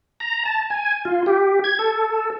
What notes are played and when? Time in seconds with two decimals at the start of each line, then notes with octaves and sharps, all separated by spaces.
0.20 A#5
0.45 A5
0.70 G#5
1.05 F4
1.26 G4
1.64 G#6
1.79 A4